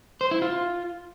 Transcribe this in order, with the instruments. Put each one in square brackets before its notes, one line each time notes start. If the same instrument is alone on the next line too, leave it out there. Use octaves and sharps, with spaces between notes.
[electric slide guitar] C5
E4
F4